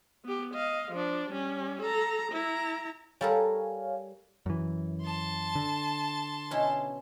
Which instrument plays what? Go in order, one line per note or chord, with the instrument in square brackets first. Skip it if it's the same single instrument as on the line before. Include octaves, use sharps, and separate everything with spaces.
[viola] B3 G4
D#5 F5
F3 D4
G3 C#4
A4 A#5
E4 A#5
[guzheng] G3 A4 A#4 [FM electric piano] C#5 F5 G#5
[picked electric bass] F#2 E3
[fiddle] A5 C6
[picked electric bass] D3
[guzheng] B2 C#4 E4